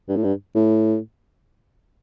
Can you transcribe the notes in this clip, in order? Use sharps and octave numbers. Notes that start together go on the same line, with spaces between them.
G2
A2
G2
A2